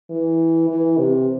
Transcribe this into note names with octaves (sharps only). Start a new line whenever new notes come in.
E3
E3
C3